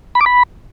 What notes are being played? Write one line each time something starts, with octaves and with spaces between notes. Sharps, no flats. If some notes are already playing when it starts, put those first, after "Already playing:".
B5
D6
B5